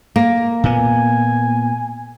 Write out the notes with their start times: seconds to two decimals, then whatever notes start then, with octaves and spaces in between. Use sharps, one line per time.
0.16 A#3
0.64 A#2 B3 G#5